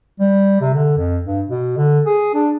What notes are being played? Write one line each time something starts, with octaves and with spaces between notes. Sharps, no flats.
G3
C3
D3
F2
G2
B2
D3
G#4
D4